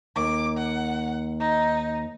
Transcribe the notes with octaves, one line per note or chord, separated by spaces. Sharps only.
D#2 D6
F#5
D#4